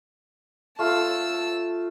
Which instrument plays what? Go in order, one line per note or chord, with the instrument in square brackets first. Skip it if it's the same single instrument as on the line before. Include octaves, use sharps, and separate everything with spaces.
[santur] A3 F4 A4 [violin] A5 E6